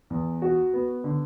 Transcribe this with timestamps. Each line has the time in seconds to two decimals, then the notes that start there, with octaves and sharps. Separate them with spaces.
0.10 E2
0.42 F#4
0.73 B3
1.04 D3